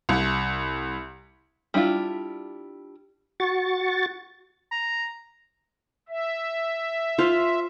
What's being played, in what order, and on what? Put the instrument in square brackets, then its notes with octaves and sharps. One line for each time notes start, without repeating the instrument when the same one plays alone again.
[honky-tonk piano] C2
[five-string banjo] G3 D4 E4 F4
[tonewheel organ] F#4 C#6 A6
[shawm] A#5
[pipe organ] E5
[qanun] F4 C5 F5